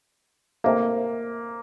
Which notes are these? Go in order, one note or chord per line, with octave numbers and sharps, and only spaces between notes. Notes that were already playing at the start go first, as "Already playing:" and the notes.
C3 D#3 A3 A#3